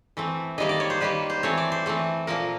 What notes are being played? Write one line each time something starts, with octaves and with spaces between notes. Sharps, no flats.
E3 A3 C4
D#3 G3 A#3 D#5
D5
C#5
C5
D#3 G3 A#3 B4
C5
E3 A3 C4 C#5
D5
C5
E3 A3 C4
A#2 F3 A#3 A#4